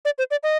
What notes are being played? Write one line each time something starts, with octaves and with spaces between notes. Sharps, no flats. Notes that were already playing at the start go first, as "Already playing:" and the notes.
D5
C5
D5
D#5